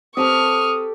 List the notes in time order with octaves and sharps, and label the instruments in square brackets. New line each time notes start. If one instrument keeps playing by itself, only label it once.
[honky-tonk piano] C4 [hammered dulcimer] G4 A4 A5 [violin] C#6 F6 [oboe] D#6